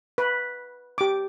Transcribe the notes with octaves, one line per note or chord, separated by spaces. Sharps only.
B4
G4 D6